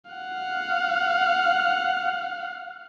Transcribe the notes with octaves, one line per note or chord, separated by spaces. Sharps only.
F5 F#5